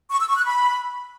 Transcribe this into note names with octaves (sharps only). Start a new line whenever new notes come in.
C#6
E6
C#6
F#6
B5